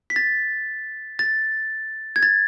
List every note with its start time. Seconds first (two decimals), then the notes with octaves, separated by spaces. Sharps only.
0.10 B6
0.16 A6
1.19 A6
2.16 G#6
2.23 A6